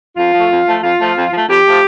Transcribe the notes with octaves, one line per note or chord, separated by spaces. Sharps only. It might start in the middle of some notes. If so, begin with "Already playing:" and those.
F2 F4
F3 A3
F2
F3 A3
F2 F4
F3 A3
F2
F3
A3
F2 G4
F3 A3